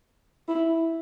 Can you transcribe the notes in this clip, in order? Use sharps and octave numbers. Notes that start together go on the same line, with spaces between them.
E4